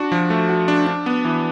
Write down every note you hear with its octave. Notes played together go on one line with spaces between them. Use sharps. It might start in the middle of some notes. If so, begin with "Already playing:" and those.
Already playing: D4 F#4
F3
A3
F#4
D4
D4
B3
E3